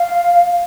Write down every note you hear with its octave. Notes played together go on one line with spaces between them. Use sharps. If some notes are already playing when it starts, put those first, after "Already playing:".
Already playing: F5